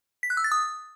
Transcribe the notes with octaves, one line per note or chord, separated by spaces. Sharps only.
B6
F#6
E6
A6
D#6